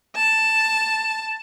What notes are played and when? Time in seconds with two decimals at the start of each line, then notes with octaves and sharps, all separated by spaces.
0.16 A5